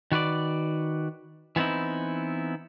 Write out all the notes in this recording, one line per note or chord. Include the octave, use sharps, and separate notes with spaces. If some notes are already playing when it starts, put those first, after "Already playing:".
D#3 F#4 B4 D5
E3 B3 C4 D#4 E4